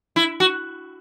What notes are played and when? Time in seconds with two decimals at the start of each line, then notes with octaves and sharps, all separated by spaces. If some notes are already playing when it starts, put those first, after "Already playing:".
0.16 E4
0.40 F#4